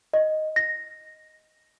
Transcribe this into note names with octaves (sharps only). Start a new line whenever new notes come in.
D#5
A#6